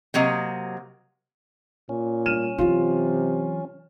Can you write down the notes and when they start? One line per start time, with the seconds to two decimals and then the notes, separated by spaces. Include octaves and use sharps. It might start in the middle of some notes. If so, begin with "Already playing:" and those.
0.14 C3 F#3 A#3 D#5
1.89 A#2 C#4
2.26 G3 F6 D#7 E7
2.58 C3 E3 F#3 F4